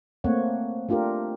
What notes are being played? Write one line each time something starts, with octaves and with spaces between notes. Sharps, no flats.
A3 A#3 C4 C#5 F#5
A3 D4 F4 G4 A#4